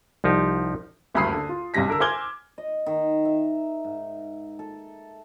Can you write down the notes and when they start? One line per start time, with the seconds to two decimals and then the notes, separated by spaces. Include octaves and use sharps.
0.24 C2 F3 D#4 G4
1.14 F#1 D2 G2 B5 D#6 C7
1.32 D3
1.49 F4
1.74 B1 G2 C3 G3 A#6 B6
1.88 D3 A#4 E6
2.00 C5 G#5 D6 F6 G#6 G7
2.58 D#5
2.86 D#3
3.25 E5
3.84 G#2
4.59 A4